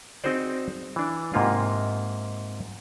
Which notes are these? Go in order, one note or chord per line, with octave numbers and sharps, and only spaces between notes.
C4 D#4 F#4 G#4 C5 D5
E3 D4
G#2 C3 A#3 D#4 F4